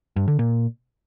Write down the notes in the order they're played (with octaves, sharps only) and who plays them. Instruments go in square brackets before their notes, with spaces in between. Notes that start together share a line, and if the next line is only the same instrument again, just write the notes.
[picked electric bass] G2
D3
A#2